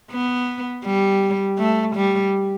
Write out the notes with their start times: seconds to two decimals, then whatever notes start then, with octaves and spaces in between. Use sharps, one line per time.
0.11 B3
0.84 G3
1.58 A3
1.95 G3